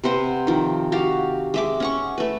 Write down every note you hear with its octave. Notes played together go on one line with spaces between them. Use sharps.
C3 B4 C5 F#5
D#3 F3
F#4 G4 F5
G#3 E5 D6
C#4 F#5 C#6
A3 B4